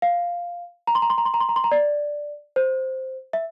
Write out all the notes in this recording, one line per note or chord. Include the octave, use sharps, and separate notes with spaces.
F5
A#5
C6
A#5
C6
A#5
C6
A#5
C6
A#5
C6
A#5
D5
C5
E5